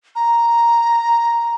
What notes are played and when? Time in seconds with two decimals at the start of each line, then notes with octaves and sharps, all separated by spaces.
0.16 A#5